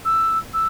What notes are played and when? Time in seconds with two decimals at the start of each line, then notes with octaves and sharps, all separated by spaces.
0.04 E6
0.53 E6